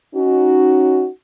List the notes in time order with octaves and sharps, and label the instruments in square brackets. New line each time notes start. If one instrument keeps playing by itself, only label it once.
[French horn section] C#4 D#4 F#4